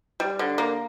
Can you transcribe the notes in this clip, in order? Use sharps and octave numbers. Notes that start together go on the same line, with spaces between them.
G3
D3
A#3